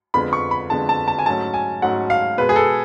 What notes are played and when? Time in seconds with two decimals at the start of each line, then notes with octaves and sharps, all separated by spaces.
0.14 F2 D3 G#3 B3 B5
0.33 C#6
0.51 B5
0.70 F2 D3 G#3 B3 A5
0.89 A5
1.08 A5
1.19 G#5
1.26 G#2 F#3 A3 C#4 A5
1.54 G#5
1.82 G#2 F#3 A3 C#4 F#5
2.10 F5
2.37 B2 G#3 B3 B4
2.49 G#4
2.56 A4